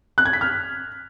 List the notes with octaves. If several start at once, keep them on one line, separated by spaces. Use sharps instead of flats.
F#6
G#6
B6
F6